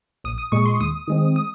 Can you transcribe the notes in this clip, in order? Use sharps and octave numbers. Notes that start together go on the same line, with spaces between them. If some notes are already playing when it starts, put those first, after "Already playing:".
A#1 D#6
D#6
A#2 G#3 C#6
C6
D#2 D#6
D#3 G#3 C4
D#6